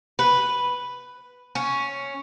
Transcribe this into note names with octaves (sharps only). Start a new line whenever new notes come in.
B4
C#4